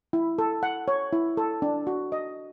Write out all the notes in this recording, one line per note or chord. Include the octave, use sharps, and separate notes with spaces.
E4
A4
F#5
C#5
E4
A4
D4
F#4
D#5